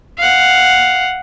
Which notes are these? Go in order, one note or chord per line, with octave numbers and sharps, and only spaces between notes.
F5 F#5